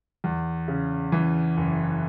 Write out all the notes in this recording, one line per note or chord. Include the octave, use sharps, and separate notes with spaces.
E2
C#3
E3
F#1